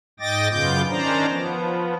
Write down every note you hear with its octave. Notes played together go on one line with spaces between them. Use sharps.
G#2 D#5 G5 D6 A6 A#6
F#2 C#3 B3 F4 D6 G6
D#3 C#4 D4 C5 D5 A#5
F3 B3